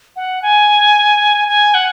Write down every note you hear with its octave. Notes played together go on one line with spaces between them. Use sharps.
F#5
G#5
G#5
F#5